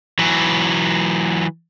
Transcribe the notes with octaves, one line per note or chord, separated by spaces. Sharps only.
E3 F#3